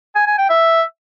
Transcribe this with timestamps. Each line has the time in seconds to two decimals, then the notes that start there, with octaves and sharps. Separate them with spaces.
0.15 G#5
0.27 G#5
0.38 G5
0.50 E5